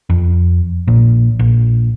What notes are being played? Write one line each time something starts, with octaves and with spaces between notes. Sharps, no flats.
F2
A#1 A#2
A#1